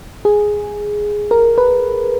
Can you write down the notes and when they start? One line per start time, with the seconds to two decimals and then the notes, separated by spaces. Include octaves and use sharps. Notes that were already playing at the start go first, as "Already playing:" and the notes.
0.25 G#4
1.31 A#4
1.58 B4